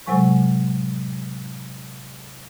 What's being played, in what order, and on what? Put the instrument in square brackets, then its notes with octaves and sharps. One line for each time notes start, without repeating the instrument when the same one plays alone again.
[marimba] A2 C3 F#3 G#3 G#5 C#6